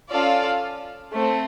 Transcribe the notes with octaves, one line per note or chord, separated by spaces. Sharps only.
C#4 F4 A4 D5 F5
A3 C4